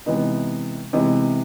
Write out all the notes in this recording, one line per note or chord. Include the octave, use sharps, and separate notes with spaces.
C3 E3 G#3 B3 D#4
C3 E3 G#3 B3 D#4